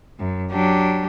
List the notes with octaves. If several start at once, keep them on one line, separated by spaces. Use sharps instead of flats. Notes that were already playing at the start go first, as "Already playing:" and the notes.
F#2
F#3 D4 G4